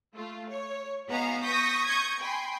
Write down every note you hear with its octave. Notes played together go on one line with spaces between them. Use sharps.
A3 F4
C#5
B3 D#4 F#4 G#4 F5 A#5
C#6 D#6 G6 A#6 B6
C#6 D#6 G6 G#6
G5 G#5 B5 C6